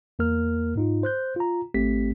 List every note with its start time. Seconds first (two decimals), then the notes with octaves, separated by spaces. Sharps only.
0.19 E2 A#3 A#4 F6
0.76 G#2 D#4 F4
1.03 C5 F#6 G6
1.36 F4 A#5
1.74 G#1 A3 C4 G4 B6